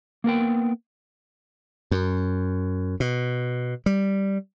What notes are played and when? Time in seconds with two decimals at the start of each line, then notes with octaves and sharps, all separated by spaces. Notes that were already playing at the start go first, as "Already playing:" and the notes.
0.24 A#3 B3 A#4 G5
1.91 F#2
3.00 B2
3.86 G3